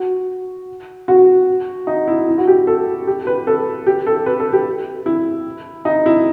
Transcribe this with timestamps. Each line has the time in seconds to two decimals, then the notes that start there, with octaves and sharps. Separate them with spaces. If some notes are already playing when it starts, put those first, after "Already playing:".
Already playing: F#4
1.08 F#4
1.87 D#4
2.08 E4
2.28 E4
2.38 F#4
2.47 G4
2.67 A4
3.07 G4
3.27 B4
3.47 A4
3.87 G4
4.07 A4
4.26 B4
4.40 A4
4.53 G4
5.06 E4
5.85 D#4
6.06 E4